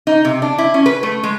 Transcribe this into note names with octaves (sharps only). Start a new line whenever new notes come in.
D#4
C3
D4
E4
C#4
B4
A3
G#3